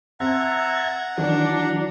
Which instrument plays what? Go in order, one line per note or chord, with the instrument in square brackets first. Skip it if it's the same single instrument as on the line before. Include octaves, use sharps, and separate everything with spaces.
[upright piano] C4 [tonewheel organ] E5 A5 G#6 [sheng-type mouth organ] F#5 A#5
[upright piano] D#3 [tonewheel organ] E3 F#3 [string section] D4